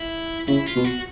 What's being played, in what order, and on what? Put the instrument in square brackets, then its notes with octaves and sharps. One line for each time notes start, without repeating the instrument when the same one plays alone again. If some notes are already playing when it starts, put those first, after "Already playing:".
Already playing: [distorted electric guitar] E4
[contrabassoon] C#3 [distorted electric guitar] E4
[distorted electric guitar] F4
[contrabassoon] B2
[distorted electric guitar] F#4